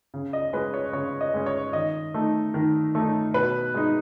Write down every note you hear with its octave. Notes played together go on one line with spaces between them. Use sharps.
C#3
D#5
G#3 C#4 B4
C#5
C#3 C#5
D#5
G#3 C#4
C#5
D#3 D#5
A3 D#4
D#3
A3 D#4
B2 B4
G#3 D#4